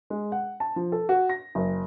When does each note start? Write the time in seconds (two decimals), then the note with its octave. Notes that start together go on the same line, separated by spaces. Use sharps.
0.10 G#3
0.32 F#5
0.60 A5
0.76 F3
0.92 A4
1.09 F#4
1.29 A#6
1.55 F#1